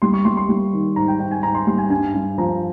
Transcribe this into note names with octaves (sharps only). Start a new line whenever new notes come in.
G3 C6
C#6
G3 C6
C6
G3
D#3
G#2 A#5
G5
G#2 G5
G#5
G#2 A#5
C6
G3 C6
G#5
G2 G#5
G2
F3 A#5